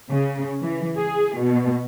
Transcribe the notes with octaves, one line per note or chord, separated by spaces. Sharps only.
C#3
E3
G#4
B2